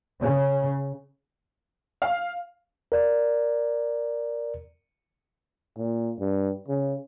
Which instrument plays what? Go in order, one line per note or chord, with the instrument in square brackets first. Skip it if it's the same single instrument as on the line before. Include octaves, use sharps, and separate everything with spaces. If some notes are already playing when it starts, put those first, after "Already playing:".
[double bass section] C#3
[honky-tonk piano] F5
[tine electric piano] A#4 D5
[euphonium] A#2
G2
C#3